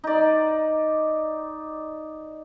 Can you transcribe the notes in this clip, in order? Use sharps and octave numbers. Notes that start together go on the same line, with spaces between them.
D#4 D5